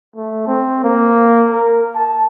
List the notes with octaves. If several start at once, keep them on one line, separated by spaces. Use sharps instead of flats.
A3
C4
A#3
A#4
A5